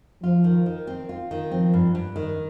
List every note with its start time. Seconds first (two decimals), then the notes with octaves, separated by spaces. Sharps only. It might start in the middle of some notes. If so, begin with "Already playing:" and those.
0.23 F3 F4
0.44 D#3
0.66 D#3
0.87 C4
1.09 F4
1.31 D#3
1.51 F3 C4
1.73 G2
1.95 G2
2.16 D#3